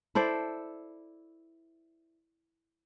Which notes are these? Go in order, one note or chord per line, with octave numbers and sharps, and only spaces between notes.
E4 A4 C5 D5